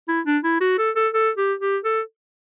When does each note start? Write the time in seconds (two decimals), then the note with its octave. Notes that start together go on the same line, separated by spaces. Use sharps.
0.08 E4
0.26 D4
0.44 E4
0.61 F#4
0.78 A4
0.96 A4
1.14 A4
1.37 G4
1.61 G4
1.84 A4